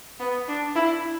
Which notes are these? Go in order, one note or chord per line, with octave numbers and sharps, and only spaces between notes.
B3
D4
E4